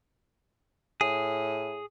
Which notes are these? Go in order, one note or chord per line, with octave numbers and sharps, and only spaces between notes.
A2 G#4